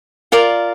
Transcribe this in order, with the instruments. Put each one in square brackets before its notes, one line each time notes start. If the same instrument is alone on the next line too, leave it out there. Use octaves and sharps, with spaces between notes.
[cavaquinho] F4 A#4 D5